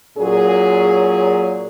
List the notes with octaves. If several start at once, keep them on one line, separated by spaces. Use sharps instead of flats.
A#2 F#3 C#4 G#4